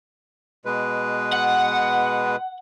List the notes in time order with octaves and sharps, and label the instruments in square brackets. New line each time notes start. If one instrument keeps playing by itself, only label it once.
[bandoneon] B2 G#3 B4
[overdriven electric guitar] F#5